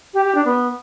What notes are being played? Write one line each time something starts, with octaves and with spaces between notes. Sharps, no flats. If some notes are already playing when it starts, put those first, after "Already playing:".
G4
G4
D4
B3